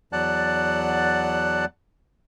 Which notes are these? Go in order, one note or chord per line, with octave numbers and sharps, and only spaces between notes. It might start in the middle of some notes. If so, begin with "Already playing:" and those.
E2 F#3 D5 F#5 A5 F#6